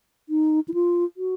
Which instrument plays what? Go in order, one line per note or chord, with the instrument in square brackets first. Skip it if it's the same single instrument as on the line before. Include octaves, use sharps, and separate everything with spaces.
[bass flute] D#4
E4
F4
F#4